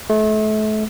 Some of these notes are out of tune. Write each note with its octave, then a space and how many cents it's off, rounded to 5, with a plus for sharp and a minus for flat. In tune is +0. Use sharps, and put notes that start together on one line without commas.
A3 -35